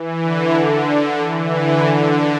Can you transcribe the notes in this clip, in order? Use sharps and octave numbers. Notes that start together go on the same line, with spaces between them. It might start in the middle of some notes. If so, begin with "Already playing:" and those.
Already playing: E3
D3
E3
D3
D3